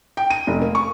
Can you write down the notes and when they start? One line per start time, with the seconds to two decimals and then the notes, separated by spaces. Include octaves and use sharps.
0.17 G5
0.30 D#7
0.47 F1
0.62 A#3
0.75 C#6